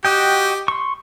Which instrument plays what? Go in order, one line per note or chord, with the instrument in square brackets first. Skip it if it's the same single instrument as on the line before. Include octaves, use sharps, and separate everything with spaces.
[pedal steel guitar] F#4 D#5 G5 [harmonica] G4
[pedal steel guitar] C6 C#6